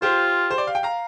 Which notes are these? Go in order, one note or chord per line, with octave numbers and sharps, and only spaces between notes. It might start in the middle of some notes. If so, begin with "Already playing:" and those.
F4 G4 C5
C5
D5
F5
G5
F5 A#5